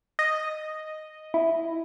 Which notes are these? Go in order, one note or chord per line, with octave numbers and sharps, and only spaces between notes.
D#5
E4